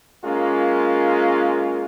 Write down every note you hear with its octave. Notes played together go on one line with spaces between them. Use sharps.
G#3 A#3 C#4 F4